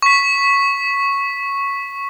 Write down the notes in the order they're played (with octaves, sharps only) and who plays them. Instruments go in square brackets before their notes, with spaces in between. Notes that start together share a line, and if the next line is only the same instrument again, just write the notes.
[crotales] C#6 B6